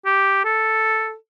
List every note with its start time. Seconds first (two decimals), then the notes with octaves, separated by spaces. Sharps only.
0.06 G4
0.45 A4